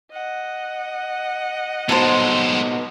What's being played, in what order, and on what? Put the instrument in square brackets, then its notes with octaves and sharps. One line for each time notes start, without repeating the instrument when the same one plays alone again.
[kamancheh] D#5 F#5
[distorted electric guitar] G#3 G4 [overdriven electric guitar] B3 D#4 [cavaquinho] A4 C5